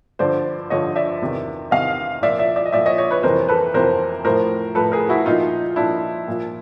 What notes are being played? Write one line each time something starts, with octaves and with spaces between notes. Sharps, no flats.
G2 D3 F3 C5 D5
G2 D3 F3 C#5 D#5
D5 E5
E2 C3 D#3
E2 C3 D#3 D#5 F5
A#2 F3 D5 E5
D5 E5
D5 E5
D#5
A#2 D5 E5
F3
C#5 D#5
C#5 D#5
B4 C#5
F2 C3 E3 A#4 C5
A4 B4
F2 C3 E3 A#4 C5
A2 F3 A#4 C5
A2 F3 A4 B4
G#4 A#4
E4 F#4
A#2 F3 D#4 F4
A#2 F3 D4 E4
A#2 F3